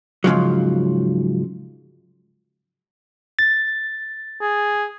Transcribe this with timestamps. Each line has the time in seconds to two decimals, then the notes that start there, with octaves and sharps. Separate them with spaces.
0.24 G#2 C#3 F3 F#3
3.39 A6
4.41 G#4